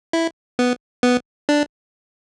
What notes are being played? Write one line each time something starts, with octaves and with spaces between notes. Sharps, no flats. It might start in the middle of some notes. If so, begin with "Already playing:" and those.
E4
B3
B3
D4